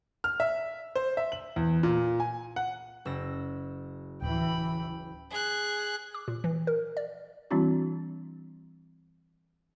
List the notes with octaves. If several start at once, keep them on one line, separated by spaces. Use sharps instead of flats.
F6
E5
C5
E5
F#7
E2
A#2
G#5
F#5
F#1 E6 A#6
D1 E3 G5 B5
G#4 F#6
D6
A#2
E3
A#4
D5
E3 G3 C4 D4 E4 F#4